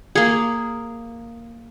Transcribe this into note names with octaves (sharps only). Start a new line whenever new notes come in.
A#3 G#4